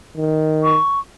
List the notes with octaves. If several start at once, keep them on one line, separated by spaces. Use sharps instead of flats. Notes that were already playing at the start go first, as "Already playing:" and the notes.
D#3
C#6